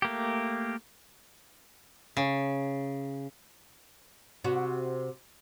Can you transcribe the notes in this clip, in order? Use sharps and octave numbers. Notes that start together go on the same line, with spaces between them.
A3 A#3 G4
C#3
C3 F#4